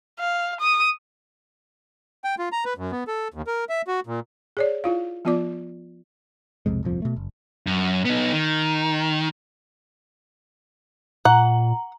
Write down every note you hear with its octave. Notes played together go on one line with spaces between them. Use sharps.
F5
D#6
G5
F4
A#5
B4
F#2
B3
A4
D#2
A#4
E5
F#4
A#2
G#4 C#5 D5
E4 F4 F5
F3 B3 F4 D5 D6
B1 F2 C3 G#3
D#1 C2 F2 F3
B2 A3
F#1
F#2
B3 D#4
D#3
A#2 F#5 A#5